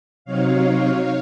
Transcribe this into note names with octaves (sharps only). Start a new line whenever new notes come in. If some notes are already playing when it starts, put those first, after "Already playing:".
C3 F#3 C4 D#4 C#5 F5